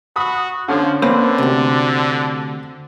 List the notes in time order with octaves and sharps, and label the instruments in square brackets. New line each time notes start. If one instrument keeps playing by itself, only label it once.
[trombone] F#4 [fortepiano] B5 D#6
[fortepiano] D3 C#4 F6 [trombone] F3
[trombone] D3 [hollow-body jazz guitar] A#3 C#4 B4 [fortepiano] C4
[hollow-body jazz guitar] D2 C3